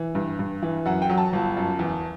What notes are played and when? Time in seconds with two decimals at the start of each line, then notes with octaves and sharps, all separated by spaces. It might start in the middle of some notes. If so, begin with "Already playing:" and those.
Already playing: E3
0.15 G2
0.39 G2
0.62 E3
0.85 F#2 F#5
1.02 G5
1.09 F#3
1.18 A5
1.33 G1
1.57 F#2
1.79 E2